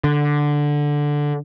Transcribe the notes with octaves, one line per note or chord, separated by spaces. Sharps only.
D3